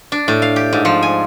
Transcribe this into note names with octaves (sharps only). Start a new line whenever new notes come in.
D4
A2
F5
G4
G#2
F3
G#5